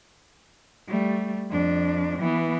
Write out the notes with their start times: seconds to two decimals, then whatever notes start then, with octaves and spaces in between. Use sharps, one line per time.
0.88 G3 A3
1.50 F2 D4
2.19 E3 B3